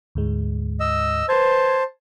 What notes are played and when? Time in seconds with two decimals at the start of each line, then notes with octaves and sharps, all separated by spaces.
0.15 D2 G#2 G#3
0.80 D#5 E6
1.29 B4 C5 A5 G#6